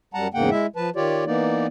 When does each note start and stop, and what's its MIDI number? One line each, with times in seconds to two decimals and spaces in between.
0.14 0.28 42
0.14 0.28 55
0.14 0.28 78
0.14 0.28 81
0.14 0.28 82
0.34 0.50 40
0.34 0.50 44
0.34 0.50 49
0.34 0.50 58
0.34 0.50 78
0.34 0.50 79
0.51 0.66 56
0.51 0.66 64
0.51 0.66 76
0.76 0.90 53
0.76 0.90 71
0.76 0.90 81
0.96 1.25 51
0.96 1.25 65
0.96 1.25 67
0.96 1.25 73
0.96 1.25 74
1.26 1.67 52
1.26 1.67 58
1.26 1.67 59
1.26 1.67 63
1.26 1.67 74